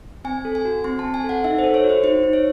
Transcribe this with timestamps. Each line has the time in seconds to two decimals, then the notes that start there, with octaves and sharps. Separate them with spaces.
0.24 C4 G#5
0.45 A4
0.55 G#5
0.65 F#4
0.84 C4 C6
0.99 A5
1.05 C4
1.14 G#5
1.24 A4
1.29 F#5
1.44 D#4 E5
1.59 C5
1.64 A4
1.74 C#5
1.84 F#4
1.89 C5
2.03 D#4 C5
2.23 D#4
2.33 C#5